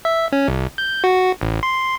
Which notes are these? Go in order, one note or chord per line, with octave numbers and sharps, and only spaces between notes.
E5
C#4
C2
G6
F#4
A1
C6